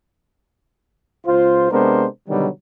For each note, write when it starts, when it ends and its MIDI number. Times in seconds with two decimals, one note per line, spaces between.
1.26 1.70 37
1.26 1.70 65
1.26 1.70 72
1.71 2.06 48
1.71 2.06 56
1.71 2.06 59
1.71 2.06 62
1.71 2.06 70
1.71 2.06 72
2.29 2.48 47
2.29 2.48 50
2.29 2.48 51
2.29 2.48 54
2.29 2.48 55